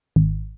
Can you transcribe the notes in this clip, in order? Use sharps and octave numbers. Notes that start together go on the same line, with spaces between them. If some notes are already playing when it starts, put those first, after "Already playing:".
G#1